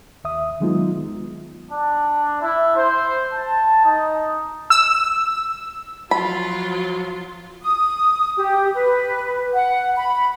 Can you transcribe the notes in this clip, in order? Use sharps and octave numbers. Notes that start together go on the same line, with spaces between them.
D#2 E5 D#6
D#3 F#3 G#3 B3 D#4 F4
D4
E4
C5
A5
D#4
E6
F3 F#3 F4 B5
D#6
G4
B4
F#5
B5